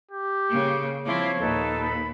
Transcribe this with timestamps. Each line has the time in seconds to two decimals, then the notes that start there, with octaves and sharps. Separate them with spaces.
0.11 G4
0.49 C#3 A#3
1.05 F3 C4 E4 C#5 D6
1.40 D#2 A#2 D#4 A4 B4
1.82 B5